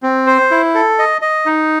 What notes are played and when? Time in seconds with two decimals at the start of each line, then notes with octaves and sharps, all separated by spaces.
0.03 C4
0.27 C5
0.51 E4
0.74 A4
0.99 D#5
1.22 D#5
1.46 D#4